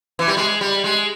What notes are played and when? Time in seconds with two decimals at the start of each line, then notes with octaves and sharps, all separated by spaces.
0.19 E3
0.28 G3
0.37 G#3
0.61 G3
0.84 G#3